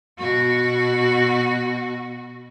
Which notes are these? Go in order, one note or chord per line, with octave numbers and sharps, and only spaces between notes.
B2 F#4